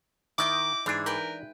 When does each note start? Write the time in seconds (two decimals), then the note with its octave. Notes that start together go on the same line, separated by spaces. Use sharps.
0.38 D#3 E4 D#5 G5 D6
0.86 G#2 E3 D4 G#5
1.06 A#4 B4 G5 B5